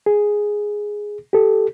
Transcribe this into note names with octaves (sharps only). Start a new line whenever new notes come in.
G#4
G4 A4